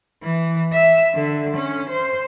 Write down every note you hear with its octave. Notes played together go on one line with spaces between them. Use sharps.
E3
E5
D3
C#4
C5